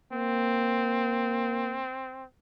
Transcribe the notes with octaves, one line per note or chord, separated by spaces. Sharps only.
A#3 C4